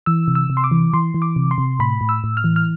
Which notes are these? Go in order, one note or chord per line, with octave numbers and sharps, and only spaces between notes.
E3 E6
C3
E6
C3
C6
D6
E3
E3 C6
E3
D6
C3
C6
C3
A2 B5
A2
E6
A2
F6
E3
F6